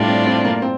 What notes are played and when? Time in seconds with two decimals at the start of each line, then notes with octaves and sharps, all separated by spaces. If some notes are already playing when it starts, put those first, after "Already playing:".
Already playing: A2 G3 D4 F4
0.08 C4
0.27 C4
0.45 A#3
0.62 C4